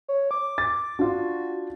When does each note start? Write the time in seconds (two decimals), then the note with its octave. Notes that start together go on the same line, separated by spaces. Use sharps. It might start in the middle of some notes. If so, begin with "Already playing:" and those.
0.08 C#5
0.31 D6
0.58 A6
0.99 D4 F4 F#4